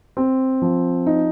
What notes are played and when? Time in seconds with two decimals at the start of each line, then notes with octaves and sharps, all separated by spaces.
0.17 C4
0.62 F3
1.06 D#4